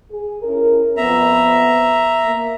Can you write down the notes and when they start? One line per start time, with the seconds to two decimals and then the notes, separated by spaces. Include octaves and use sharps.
0.11 G#4
0.42 C#4 E4 A#4
0.97 F2 B3 E5 A#5
2.24 A#3